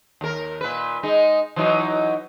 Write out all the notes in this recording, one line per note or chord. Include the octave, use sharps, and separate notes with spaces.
D#2 A#4
A#2 B4
G#3 D#4
E3 F#3 D#4